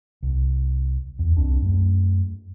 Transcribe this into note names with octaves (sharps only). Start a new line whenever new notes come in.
C2
E2
C2 C4 D4
F#2 A3